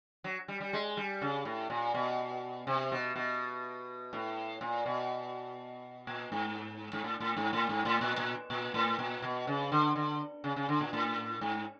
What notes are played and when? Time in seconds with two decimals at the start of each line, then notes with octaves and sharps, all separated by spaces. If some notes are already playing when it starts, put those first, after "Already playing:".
0.24 F#3
0.48 G3
0.60 G3
0.73 G#3
0.97 G3
1.21 C#3
1.45 A2
1.70 A#2
1.94 B2
2.67 C3
2.92 B2
3.16 B2
4.13 A2
4.61 A#2
4.86 B2
6.07 A#2
6.32 G#2
6.93 G#2
7.04 A2
7.20 A2
7.37 G#2
7.53 A2
7.69 G#2
7.85 A2
8.01 A#2
8.18 A#2
8.50 A#2
8.74 A2
8.99 A#2
9.22 B2
9.47 C#3
9.72 D3
9.96 D3
10.44 C#3
10.56 C#3
10.69 D3
10.81 A#2
10.93 A2
11.41 G#2